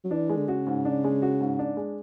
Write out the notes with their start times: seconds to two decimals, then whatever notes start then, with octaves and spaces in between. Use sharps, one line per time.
0.04 F#3
0.11 E3 D4
0.29 G#3
0.37 D3
0.48 C#3 F#4
0.67 G#2
0.85 D4
1.04 G#3
1.22 F#4
1.41 G#2
1.59 D4
1.77 G#3